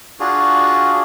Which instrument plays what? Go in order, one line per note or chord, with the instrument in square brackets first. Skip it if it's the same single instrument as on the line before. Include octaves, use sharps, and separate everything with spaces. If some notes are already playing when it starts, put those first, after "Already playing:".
[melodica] D4 F4 F#4 G#4